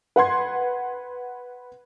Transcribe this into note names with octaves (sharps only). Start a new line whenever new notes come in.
B4 F#5 C6 G#6